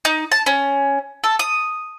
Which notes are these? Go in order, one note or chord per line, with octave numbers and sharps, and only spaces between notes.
D#4
A5
C#4
A4
D#6